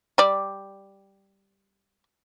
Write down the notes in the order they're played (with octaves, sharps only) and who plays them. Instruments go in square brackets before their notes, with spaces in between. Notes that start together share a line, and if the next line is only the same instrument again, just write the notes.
[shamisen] G3 D5